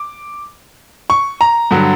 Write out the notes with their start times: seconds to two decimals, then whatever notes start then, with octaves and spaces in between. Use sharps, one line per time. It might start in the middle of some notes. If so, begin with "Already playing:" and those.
Already playing: D6
1.10 C#6
1.41 A#5
1.71 G2 D3 F#3